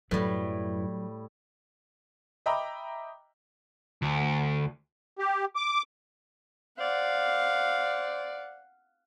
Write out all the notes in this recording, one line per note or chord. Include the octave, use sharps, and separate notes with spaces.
F#2 A2 F#3 G3 E4 B4
D#5 E5 G5 A#5 B5 D6
D2
G4
D6
C5 D5 F5 F#5